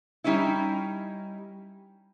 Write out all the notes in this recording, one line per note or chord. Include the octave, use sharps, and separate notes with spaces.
G3 C#4 D#4 E4